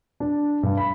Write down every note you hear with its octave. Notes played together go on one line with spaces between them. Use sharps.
D4
G2
B5